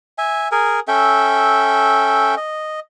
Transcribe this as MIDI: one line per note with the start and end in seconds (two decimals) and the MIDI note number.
0.18 0.48 76
0.18 0.48 80
0.52 0.80 68
0.52 0.80 70
0.52 0.80 80
0.88 2.35 61
0.88 2.35 69
0.88 2.35 76
0.88 2.35 79
2.37 2.80 75